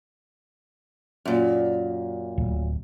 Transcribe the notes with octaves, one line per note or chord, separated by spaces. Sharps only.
F#2 A#2
D1